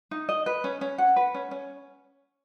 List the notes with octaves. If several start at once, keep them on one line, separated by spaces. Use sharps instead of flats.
D#4
D#5
B4
C#4
C#4
F#5
B4
C#4
C#4